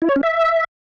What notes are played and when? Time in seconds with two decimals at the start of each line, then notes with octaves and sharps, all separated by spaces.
0.02 E4
0.09 C#5
0.16 C#4
0.23 E5